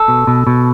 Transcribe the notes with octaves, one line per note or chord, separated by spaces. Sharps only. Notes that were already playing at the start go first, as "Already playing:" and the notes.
Already playing: A4
B2
B2
B2